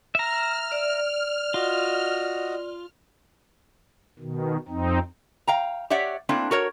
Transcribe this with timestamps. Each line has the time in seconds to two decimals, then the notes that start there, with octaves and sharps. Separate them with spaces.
0.15 E5 A#5 F6
0.72 D5
1.54 F4 F#4 D#5
4.19 B2 D#3
4.68 F2 C4 D#4
5.47 F5 G5 A#5
5.90 G4 C#5 D5 E5 F#5
6.29 A3 A#3 C4 D4 E4
6.51 F#4 A#4 C#5